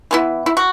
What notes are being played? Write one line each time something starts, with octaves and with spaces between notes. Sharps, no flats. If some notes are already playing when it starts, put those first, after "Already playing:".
E3 B3 E4
E4
F#4